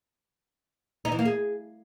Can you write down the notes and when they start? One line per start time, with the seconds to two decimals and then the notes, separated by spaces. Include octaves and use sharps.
1.05 D#4
1.12 E3
1.19 A#3
1.25 G#4